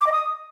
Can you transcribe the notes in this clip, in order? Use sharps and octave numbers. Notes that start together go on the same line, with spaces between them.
D6
D#5
D#6